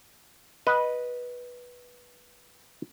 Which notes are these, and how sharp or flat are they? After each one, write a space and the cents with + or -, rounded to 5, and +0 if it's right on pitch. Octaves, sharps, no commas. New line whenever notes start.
B4 -10 D#5 +0 F#5 +0